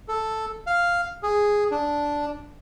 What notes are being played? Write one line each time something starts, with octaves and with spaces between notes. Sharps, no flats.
A4
F5
G#4
D4